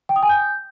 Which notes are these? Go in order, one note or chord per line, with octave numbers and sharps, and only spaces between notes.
G5
D#6
G#5
G6